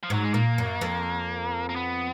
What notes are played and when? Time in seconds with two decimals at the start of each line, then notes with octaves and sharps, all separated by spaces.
0.03 F3
0.10 G#2 F#3
0.24 G#3
0.34 A#2 A#3
0.58 F#2
0.81 F2
1.69 A#3
1.76 B3